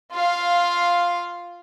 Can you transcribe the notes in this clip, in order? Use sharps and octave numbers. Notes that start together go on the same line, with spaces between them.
F4 F5